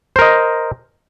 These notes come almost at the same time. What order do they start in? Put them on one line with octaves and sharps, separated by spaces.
C5 A#4 D#5